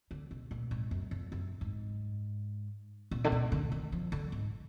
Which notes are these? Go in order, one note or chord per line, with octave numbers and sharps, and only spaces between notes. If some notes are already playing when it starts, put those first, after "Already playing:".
D3
B2
A#2
G#2
F#2
F2
F#2
G#2
A#2
D3
B2
D3
D#3
F3
D3
G#2